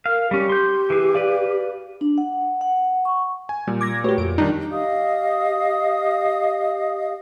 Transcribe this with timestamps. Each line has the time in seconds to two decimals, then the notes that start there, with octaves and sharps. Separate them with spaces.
0.06 A#4 F5
0.31 G3 C#4 G4
0.49 C6 G6
0.90 E3 G#4
1.15 B4 D5 F5
2.01 D4
2.18 F#5
2.61 F#5
3.05 C#6
3.49 G#5
3.67 A#2 G3
3.81 D6 G#6 A#6
4.04 A3 F#4 G4 B4 C#5
4.18 F2 D7
4.38 D#3 G3 D4 D#4
4.72 G4 D#5 F5 D#6